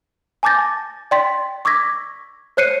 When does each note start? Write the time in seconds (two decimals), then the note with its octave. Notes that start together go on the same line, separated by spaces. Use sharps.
0.43 G#5 A5 D6 G6 A6 A#6
1.11 D5 G5 C6 A6 B6
1.65 C#6 D6 E6 G#6 A#6 B6
2.57 C5 C#5 F#6 C7 C#7 D#7